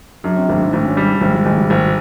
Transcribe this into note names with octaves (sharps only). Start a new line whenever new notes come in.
F#2 D4
C4
G#1 D4
D#4
G#1 D4
C#4
G3 D4
D4
G#1 G#3
G3
G#1 G#3
G3
G#1